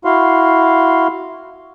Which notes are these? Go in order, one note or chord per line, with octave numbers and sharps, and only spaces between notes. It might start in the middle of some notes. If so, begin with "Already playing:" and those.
E4 F#4 F5 C6